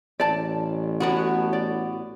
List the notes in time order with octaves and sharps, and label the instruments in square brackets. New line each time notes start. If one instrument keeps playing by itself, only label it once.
[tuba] A1 [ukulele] D5 A5
[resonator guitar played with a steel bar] A2 B3 F#4
[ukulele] D5